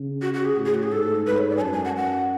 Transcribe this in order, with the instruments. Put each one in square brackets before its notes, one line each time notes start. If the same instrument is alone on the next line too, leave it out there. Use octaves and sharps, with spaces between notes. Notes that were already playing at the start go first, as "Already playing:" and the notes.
Already playing: [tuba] C#3
[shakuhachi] F#4
F#4
G#4
[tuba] A2
[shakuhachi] G#4
F#4
G#4
[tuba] G#2 [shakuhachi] A4
[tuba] G#2 [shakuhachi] B4
[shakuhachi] C#5
D5
G#5
[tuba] F#2 [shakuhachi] A5
[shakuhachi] G#5
F#5
F#5